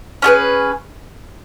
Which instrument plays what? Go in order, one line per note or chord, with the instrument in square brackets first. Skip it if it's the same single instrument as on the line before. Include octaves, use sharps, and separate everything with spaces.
[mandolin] C#4 F4 G#4 B4